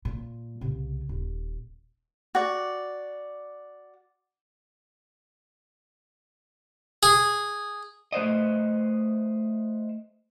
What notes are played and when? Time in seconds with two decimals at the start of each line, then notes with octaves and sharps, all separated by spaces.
0.05 A#2
0.61 C2 C#3
1.09 D#1
2.35 F#4 D5
7.03 G#4
8.12 A3 B4 C5 D#5